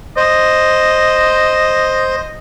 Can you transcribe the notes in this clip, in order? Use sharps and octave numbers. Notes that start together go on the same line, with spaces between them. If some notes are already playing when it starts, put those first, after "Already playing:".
C5 D#5